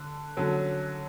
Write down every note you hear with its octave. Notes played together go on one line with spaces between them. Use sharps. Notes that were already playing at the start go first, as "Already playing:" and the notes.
Already playing: D3
D3 F#3 C#4